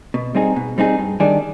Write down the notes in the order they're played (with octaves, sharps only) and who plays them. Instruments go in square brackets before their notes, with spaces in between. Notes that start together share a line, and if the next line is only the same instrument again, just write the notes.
[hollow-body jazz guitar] B2
G3 C4 D#4 G#4
B2
G3 C4 D#4 G#4
G2
D#3 G3 D4 G#4